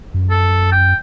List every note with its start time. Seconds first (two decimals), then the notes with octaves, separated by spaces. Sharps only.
0.14 F#2
0.30 A4
0.72 G5